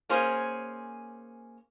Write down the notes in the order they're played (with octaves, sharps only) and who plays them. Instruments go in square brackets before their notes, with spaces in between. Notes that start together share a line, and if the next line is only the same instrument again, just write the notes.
[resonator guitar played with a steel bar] A#3 C#4 G#4 C5